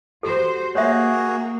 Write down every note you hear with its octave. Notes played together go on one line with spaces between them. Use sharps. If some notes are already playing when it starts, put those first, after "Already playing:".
F#4 G4 A4 C5
A#3 F#4 G#4 C#5 E5